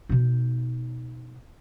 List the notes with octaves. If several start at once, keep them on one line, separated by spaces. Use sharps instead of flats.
B2 D#4